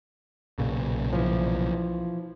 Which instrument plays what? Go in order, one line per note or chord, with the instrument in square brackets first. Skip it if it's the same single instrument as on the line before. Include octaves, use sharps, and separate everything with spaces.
[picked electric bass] B1 A#2 C#3
[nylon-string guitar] E3 F3